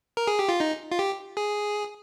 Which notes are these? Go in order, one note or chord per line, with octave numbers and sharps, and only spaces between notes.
A#4
G#4
G4
F4
D#4
F4
G4
G#4